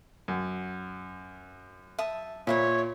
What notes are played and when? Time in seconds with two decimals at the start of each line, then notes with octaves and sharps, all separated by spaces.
0.28 F#2
1.99 E5 A5 D#6
2.47 A#2 C5 C#5 E5 B5